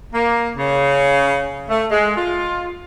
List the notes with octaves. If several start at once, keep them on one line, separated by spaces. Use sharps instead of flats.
A#3
C#3
A3
G#3
F4